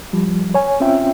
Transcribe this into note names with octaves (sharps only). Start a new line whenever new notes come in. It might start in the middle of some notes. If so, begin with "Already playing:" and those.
F3 G3
C#5 G#5
C4 C#4 F4 E5 G5